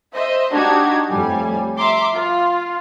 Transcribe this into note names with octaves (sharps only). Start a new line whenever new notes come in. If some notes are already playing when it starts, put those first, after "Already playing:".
C5 D#5 E5
D4 D#4 F#4 G4 G#6
F2 A2 G3 G#5
E5 A#5 C6 D6
F4